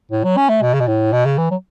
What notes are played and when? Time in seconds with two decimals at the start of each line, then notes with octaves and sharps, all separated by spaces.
0.12 A2
0.24 F#3
0.37 C#4
0.49 A3
0.62 B2
0.74 C#3
0.80 B2
0.88 A2
1.13 B2
1.26 C#3
1.38 E3
1.51 F#3